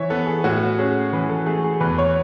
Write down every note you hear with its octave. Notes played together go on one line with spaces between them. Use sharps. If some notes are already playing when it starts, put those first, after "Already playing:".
Already playing: E3 C#5 E5
B3 A4
G#4
A2 F#4
C#4 G#4
E3 B4
A4
A3 G#4
G#4
E2 B4
C#5